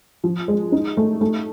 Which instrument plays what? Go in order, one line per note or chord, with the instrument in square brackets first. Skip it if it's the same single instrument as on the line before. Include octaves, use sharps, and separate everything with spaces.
[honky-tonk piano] F3
G#3
D#4
A3
A3